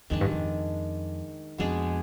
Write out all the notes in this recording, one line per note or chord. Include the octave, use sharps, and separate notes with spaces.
F2 D#3 G#3 D4
G2
F2
F2 B2 G#3 D4 G#4